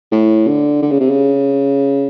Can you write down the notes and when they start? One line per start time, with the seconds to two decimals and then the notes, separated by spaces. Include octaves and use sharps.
0.12 A2
0.47 D3
0.82 D3
0.91 C#3
1.00 C3
1.10 C#3